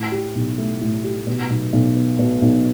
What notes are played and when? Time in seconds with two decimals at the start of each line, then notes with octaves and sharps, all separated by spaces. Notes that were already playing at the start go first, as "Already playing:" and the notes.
Already playing: A2
0.12 G4
0.35 B1
0.58 A3
0.81 A2
1.04 G4
1.27 B2
1.50 B1
1.73 B1
1.96 B3
2.19 B2
2.42 B1